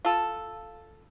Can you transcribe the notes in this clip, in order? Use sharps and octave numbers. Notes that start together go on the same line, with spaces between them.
F4 A4